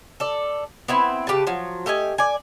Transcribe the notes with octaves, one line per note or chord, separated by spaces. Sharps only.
A4 D5
B3 C4 E4
C#3 G4 B4 A5
F3 F#3
A3 G4 D#5 G#5
D5 G#5